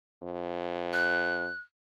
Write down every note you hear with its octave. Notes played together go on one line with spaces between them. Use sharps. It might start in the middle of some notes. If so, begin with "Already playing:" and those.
F2
F#6